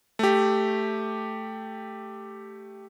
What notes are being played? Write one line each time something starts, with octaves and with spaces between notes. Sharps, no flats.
A3 G4